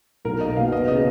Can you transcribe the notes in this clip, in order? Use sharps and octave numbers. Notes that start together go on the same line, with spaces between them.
B1 A#4
A#3 D#5
B2 F5
B3 D#5
C#3 D#5